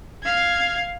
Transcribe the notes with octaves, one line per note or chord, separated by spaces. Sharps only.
F5 G#6